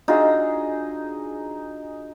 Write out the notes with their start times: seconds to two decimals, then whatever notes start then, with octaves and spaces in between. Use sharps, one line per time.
0.08 D4 D#4 F4 F#4 G#4 E6